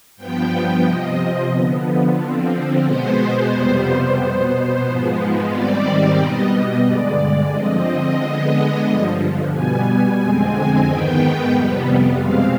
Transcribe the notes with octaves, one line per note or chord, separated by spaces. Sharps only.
G2 F3 B3 G5
C3 F3 C4 D#5
D3 F3 B3
D3 F3 C4
B2 G#3 B3 C5
F2 C3 G3 B3 C5
B2 B3
G#2 F3 G#3 B3
G#2 D#3 G3 C4 D5
B2 G3 B3 D#5
D#5
G2 D3 G#3 D5
D3 F3 C4 D#5
D3 G#3 B3
G2 D3 F3
B2 G3 B3 G#5
F2 D3 G#3 C4
G#2 D#3 B3 G5
F2 C3 G3 B3
B2 G#3 C4 F5